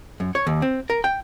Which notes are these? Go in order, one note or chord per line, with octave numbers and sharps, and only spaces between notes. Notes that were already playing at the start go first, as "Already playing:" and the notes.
F#2
C#5
D#2
C4
A#4
G5